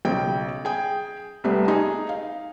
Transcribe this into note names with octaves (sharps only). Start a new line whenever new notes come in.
B1 C#3 G5
G#4 G5
C2 G3 A3 B3
D#4 G#4
F5